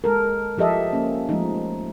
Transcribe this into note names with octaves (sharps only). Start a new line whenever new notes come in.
G#3 A4 A#4
F3 G4 A4 D#5 E5
A#3 C#4
F3 G#3 A3 D#4